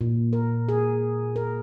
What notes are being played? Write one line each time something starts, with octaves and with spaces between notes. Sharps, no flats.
A#2
A#4
G#4
A#4